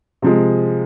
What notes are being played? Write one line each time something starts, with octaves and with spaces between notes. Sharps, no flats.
C3 F3 G#3